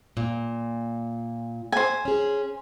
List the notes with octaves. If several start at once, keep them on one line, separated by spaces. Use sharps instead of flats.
A#2
C5 G#5
C#4 G#4